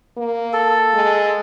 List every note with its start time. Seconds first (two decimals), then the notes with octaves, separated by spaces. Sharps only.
0.17 A#3
0.53 A4
0.94 G#3